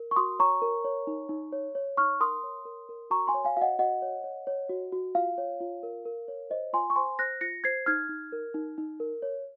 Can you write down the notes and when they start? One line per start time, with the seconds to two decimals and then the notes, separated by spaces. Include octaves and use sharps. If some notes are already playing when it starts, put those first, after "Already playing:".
Already playing: A#4
0.11 C#6
0.16 F#4 C6 D#6
0.39 C#5 A#5 C#6
0.62 A#4
0.84 C#5
1.07 D#4
1.29 D#4
1.52 C#5
1.75 C#5
1.97 D#4 C#6 F6
2.20 A#4 C6 D#6
2.43 C#5
2.65 A#4
2.89 A#4
3.10 F#4 A#5 C#6
3.27 G#5 C6
3.34 C#5
3.45 F5 G#5
3.57 F#4 D#5 F5 F#5
3.79 F#4 D#5 F#5
4.02 C#5
4.24 C#5
4.47 C#5
4.70 F#4
4.92 F#4
5.15 F4 F5
5.38 C#5
5.60 F4
5.83 A#4
6.05 A#4
6.28 C#5
6.50 C5 D#5
6.73 F4 G#5 C6
6.90 C#6
6.96 C5 G#5 C6
7.19 C5 F#6 A#6
7.41 F4 A#6 C#7
7.64 C5 G#6 C7
7.86 D#4 F6 G#6
8.09 D#4
8.32 A#4
8.54 D#4
8.78 D#4
9.00 A#4
9.22 C#5